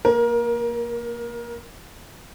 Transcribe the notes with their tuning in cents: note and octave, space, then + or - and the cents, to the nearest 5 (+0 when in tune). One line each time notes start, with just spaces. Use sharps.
A#3 +0 A#4 +25